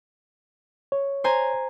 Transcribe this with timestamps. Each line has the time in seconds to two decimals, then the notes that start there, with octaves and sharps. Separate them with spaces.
0.92 C#5
1.24 C5 G#5 A#5